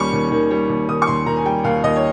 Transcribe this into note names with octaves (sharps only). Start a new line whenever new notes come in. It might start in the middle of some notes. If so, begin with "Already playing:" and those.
Already playing: D#2 D#3 G3 C#4 C#6
D#2
D#3
G3
D#2
D#3 D#6
C#6
D#2 C6
D#3 A#5
G#5
G3 G5
D#2 F5
D#2 D#5
C#5